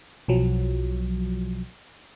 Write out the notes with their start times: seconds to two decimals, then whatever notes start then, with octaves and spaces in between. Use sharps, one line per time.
0.28 B1 F3 F#3